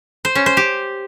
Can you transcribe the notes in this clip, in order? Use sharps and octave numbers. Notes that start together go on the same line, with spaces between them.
C5
C#4
C5
G4